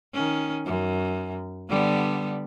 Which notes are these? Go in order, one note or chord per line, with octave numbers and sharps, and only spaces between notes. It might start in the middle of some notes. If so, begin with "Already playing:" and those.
D#3 C#4
F#2
D3 G3 B3